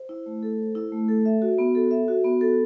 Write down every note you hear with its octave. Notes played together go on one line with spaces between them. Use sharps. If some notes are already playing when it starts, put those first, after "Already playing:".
Already playing: C5
E4
A3
A4
C5
E4
A3
A4
E5
F#4
B3
A4
E5
F#4
B3
A4